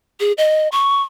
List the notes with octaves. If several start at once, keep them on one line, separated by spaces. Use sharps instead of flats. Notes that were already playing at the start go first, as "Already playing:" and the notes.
G#4
D#5
C#6